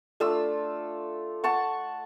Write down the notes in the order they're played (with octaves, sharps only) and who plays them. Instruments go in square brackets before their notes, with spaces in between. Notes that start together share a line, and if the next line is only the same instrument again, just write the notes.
[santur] A3 D4 F4 E6
F#5 A5 C#6